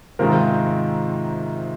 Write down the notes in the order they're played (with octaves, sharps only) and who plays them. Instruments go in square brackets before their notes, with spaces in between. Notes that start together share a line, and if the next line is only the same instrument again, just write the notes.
[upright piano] G#2 C3 [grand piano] D#3 G#3 C4 F4 A#4